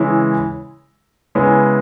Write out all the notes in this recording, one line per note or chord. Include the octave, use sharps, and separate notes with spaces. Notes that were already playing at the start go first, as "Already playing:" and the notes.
Already playing: C#3 E3 G#3 E4
C#3 G#3 B3 E4